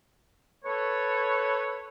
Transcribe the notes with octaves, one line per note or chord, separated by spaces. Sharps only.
A4 B4 C#5